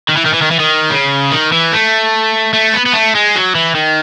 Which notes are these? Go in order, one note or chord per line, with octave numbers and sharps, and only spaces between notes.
D#3
E3
D#3
E3
D#3
E3
D#3
C#3
D#3
E3
A3
A3
B3
B3
A3
G#3
F#3
E3
D#3